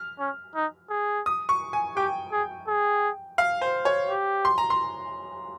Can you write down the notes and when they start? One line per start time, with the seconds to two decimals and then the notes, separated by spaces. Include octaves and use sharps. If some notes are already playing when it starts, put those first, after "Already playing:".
Already playing: F6
0.19 C#4
0.55 D#4
0.90 G#4
1.26 D#6
1.49 C#6
1.73 G#5
1.96 G4 G5
2.32 G#4
2.68 G#4
3.38 F5
3.61 C5
3.85 C#5
4.09 G4
4.45 C6
4.58 A#5
4.70 C6